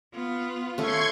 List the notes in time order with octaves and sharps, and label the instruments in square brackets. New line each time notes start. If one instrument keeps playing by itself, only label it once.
[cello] B3 F4
[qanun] A3 C#4 [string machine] C6 C#6 G#6